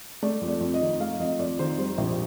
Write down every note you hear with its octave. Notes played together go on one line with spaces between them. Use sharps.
A3 D5
F2
D5
F2
D#5
D#3
A3 F5
F2 D#5
F2 D5
D#3 C5
G3 C5
A#1